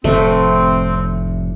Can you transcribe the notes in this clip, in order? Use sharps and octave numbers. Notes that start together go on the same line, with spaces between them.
F1 A2 C3 A3 C4